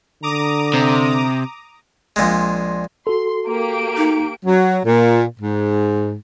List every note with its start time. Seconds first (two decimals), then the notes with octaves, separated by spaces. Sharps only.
0.23 D3 A#5 D6 D#6
0.74 C3
2.16 A#1 A#2 G#3
3.07 F#4 A4 C6
3.48 A#3 G4 D7
3.97 D#4
4.45 F#3
4.86 A#2
5.40 G#2